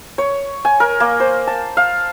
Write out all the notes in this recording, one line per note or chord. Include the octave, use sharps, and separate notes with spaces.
C#5
G#5
A#4
A#3
C5
A5
F5